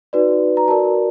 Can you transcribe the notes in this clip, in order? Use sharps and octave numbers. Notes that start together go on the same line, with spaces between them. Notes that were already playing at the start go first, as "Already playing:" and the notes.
D#4 F#4 B4 D5
A#5
F#4 A#4 D5 A5